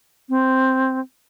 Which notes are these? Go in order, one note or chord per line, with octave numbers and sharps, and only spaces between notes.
C4